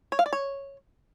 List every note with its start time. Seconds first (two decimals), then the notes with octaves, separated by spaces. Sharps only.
0.12 C#5
0.19 F5
0.26 D5
0.33 C#5